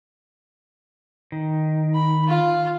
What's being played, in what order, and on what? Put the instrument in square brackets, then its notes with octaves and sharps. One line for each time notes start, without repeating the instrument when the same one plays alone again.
[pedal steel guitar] D#3
[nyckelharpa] B5
F4 F5